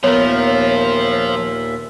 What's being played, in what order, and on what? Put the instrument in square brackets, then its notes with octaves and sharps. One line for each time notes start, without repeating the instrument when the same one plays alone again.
[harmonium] D#2 A#2 E5 [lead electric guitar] F3 F4 [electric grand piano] B3 A#4 [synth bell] C#5